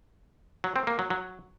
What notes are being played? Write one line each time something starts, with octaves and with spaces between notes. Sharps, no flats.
F#3
C4
A#3
F#3
F#3